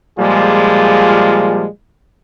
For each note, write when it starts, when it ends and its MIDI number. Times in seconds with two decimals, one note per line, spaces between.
0.18 1.65 46
0.18 1.65 53
0.18 1.65 55
0.18 1.65 56
0.18 1.65 65
0.18 1.65 68